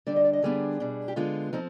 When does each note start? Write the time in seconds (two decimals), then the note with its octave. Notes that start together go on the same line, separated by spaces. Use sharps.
0.07 D3 G3 D4 D5
0.16 D#5
0.24 D5
0.33 D#5
0.42 D3 G3 B3 D4 G#4
0.80 B2 G3 D4
1.08 G4
1.16 D3 G#3 B3 F4
1.53 F3 C4 D#4